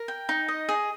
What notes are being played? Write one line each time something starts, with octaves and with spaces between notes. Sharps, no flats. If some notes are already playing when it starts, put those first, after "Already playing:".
Already playing: A#4
G5
D#4
D#5
G#4